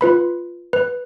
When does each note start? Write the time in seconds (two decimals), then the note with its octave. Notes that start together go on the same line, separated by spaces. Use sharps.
0.01 F4 B4 B5
0.73 B4